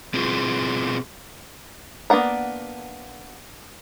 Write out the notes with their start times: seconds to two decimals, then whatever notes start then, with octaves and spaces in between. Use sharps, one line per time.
0.14 B2 C4 F4 G#4
2.10 A#3 B3 D4 F#5 A#5